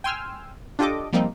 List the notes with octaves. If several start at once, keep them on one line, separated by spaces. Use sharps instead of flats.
G5 G#5 C6 E6 F6
D4 F4 G4 A4 D#5 D6
F3 G3 A#3 C4 D#4